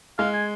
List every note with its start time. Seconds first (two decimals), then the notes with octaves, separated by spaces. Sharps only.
0.18 G#3 F5
0.33 G#5